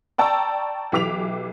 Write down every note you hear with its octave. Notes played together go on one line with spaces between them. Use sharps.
D5 G5 A5 A#5 C#6 E6
B1 E3 G4 D6 B6 F7